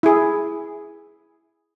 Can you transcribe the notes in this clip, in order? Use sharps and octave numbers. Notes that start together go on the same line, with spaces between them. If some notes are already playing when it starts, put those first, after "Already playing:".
E4 G#4